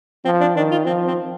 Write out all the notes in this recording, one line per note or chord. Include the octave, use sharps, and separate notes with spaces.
F3 C4
D4
D#3 D4
F4
F3 C4
C4